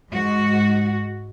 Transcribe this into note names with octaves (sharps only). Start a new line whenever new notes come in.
G#2 G#3 F#4